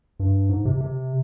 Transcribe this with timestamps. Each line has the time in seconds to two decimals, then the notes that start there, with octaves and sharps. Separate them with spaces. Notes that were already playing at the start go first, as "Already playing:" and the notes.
0.20 G2
0.49 G#2
0.65 C3
0.81 C3